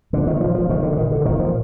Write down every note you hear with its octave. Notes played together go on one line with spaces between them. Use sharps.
A#2 D3
D#3
F3
F3
A#2 D#3
D3
D#3
D3
A#2 D#3
F3